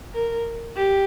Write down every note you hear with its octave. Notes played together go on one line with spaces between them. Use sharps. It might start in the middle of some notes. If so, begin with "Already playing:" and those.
A#4
G4